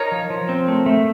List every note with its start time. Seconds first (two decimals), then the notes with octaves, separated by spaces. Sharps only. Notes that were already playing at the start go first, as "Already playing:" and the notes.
Already playing: D#4 A#4 C#5
0.12 F3
0.30 F3
0.49 C4
0.68 A3
0.86 A3